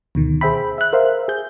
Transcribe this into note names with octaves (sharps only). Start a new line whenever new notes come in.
D2 B2 D#3
G#4 C5 E5 G5 B5
E5 F#6
A#4 C5 E5 F5
G#4 G6